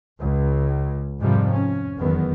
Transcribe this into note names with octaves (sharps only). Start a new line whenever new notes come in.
C#2
F2 G#2 C3 D#3 F3 G3
C#4
F1 E2 D#3 F#3 B3